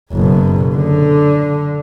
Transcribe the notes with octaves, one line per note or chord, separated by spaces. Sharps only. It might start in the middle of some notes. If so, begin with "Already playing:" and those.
F#1 B2
D3